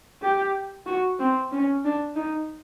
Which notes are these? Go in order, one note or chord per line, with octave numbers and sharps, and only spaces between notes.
G4
F#4
C4
C#4
D4
D#4